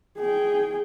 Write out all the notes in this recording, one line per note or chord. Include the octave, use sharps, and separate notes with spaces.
G#4 G5